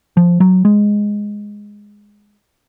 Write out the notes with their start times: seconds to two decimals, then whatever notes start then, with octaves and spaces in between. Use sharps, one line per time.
0.17 F3
0.40 F#3
0.65 G#3